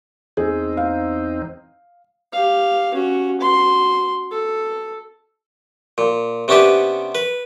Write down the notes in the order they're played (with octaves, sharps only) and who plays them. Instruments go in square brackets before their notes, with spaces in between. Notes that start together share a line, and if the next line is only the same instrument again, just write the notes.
[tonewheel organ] E2 C4 D#4 [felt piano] G#4
[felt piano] F5
[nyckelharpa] G4 F5
C#4 F#4
F#4 C6
A4
[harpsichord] A#2
C3 B3 C#4 D4 G4 B4
B4